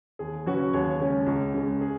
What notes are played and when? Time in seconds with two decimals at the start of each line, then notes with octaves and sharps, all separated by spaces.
0.19 D#2 G#4
0.46 C#3 F#3 C#4 F#4 B4
0.73 D#2 G#4 C#5
1.00 C#3 G#3 C#4
1.26 C#2
1.54 C#3 G#3
1.81 G#4